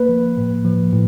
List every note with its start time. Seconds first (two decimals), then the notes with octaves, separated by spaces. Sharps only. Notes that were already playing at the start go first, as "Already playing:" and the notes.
Already playing: A#3 B4
0.09 F3
0.37 A2
0.65 F3
0.92 A2